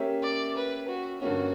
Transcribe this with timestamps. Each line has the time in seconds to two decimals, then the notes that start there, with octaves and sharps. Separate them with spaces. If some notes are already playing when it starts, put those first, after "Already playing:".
Already playing: A#3 C#4 G4 C#5 E5
0.23 D5
0.56 B4
0.88 F#4
1.22 G2 D3 A#3 C#4 F#4